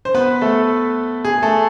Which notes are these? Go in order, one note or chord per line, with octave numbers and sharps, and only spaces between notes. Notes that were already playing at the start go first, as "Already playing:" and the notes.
C5
B3 B4
A3 A4
G#4
A3 A4